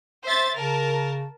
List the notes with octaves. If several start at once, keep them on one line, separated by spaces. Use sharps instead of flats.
C5 E5 A6
C#3 A#4 A5